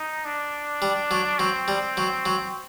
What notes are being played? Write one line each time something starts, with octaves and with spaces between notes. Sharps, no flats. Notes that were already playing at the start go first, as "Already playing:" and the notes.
Already playing: D#4
D4
G3
F#3
F#3 C4
G3
F#3
F#3